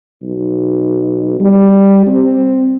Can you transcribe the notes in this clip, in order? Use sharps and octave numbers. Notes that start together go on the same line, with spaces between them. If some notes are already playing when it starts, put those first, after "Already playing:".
B1
G3
C4